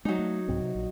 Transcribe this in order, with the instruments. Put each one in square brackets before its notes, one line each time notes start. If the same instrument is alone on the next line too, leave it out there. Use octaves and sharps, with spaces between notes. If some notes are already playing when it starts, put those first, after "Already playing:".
[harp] F#3 D#4 [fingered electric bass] G#3
[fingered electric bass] A3
C2 G#2 C4
C3
A#1